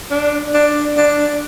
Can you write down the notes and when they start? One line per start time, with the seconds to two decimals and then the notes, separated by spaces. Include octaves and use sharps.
0.11 D4
0.54 D4
0.97 D4